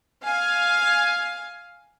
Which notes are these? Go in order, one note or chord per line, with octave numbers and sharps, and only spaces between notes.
F5 G#5